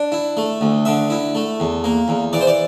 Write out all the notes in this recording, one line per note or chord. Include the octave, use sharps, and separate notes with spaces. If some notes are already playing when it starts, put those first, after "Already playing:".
Already playing: D4
E4
A3
D2
D3 E5
E4
A3
E2
A#3
E2
E3 D5
C5
D5